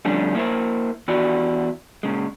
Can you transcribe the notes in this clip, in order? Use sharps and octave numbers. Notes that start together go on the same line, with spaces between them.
F2 D3 G3 A3 C#4 D4
A#3 E4 F#4 C5 E5
E2 E4 F#4 G4 D5
A#2 C#3 G#3